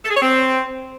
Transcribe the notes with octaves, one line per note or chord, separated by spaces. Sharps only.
A4
G#4
C#5
C4